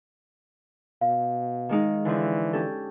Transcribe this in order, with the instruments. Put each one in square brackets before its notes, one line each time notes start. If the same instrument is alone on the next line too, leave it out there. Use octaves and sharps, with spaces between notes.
[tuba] B2 [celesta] F5
[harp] D#3 G#3 D#4
[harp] D3 F3 [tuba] E3
[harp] C#4 G4 A4